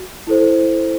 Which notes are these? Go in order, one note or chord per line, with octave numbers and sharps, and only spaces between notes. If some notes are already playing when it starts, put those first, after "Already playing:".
Already playing: F#4
E4 A4 C5